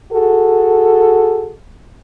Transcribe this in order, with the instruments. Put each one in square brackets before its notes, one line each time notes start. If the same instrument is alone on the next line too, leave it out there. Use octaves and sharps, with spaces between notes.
[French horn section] F#4 G#4 A4